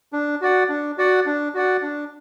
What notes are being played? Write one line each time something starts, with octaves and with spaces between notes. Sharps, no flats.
D4
F#4 D5 F#5
D4
F#4 D5 F#5
D4
F#4 D5 F#5
D4